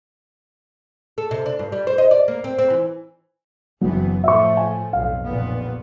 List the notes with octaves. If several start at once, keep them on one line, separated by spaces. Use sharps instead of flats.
A4
C3
D4
G2
G3
C5
D#5
D5
A#3
C4
C4
E3
F#1 E3 F#3 B3
A2 F3 A3 E5 C#6
G#5
B1 F2 F5
F1 A#2 B3